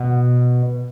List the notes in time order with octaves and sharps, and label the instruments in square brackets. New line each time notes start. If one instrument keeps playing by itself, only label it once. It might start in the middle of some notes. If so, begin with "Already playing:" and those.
Already playing: [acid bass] B2